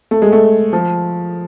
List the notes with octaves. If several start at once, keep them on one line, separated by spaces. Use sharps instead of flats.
A3
G#3
A3
F3